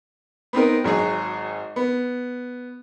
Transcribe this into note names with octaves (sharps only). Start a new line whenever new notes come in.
B3 C4 D#4 A#4
G#1 F#3 G#3 G#4
B3